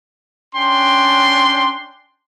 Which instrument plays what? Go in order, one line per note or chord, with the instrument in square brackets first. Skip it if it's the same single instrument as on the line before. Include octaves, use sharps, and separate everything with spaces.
[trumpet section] C#4 D4 G5 C6